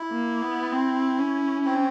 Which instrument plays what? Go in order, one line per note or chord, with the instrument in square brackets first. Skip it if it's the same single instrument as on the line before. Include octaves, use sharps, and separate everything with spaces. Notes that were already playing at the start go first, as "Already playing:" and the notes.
Already playing: [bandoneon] E4
[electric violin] A#3
B3
C4
C#4
[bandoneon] C4